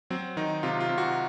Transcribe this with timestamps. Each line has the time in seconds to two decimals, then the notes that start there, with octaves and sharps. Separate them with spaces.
0.10 F#3 C4
0.37 D#3 D#4
0.63 C3 F4
0.80 F4
0.89 C3
0.98 F#4